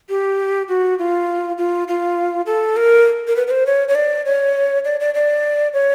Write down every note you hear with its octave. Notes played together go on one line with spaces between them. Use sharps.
G4
F#4
F4
F4
F4
A4
A#4
A#4
B4
B4
C5
C#5
C#5
D5
C#5
D5
D5
D5
C#5